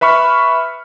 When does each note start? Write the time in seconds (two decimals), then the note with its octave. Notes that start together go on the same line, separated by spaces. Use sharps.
0.01 B4 E5 B5 C#6 F6